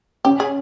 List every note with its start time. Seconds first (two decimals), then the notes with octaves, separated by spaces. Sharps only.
0.25 C#4 G4
0.40 G#4